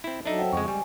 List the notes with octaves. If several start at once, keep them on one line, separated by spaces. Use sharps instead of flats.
C4 E4
F#3 D4 D#4 A4 E5
C5 F#5 G5
F2 C#3 G#3 C#6
G3 G#3 G#5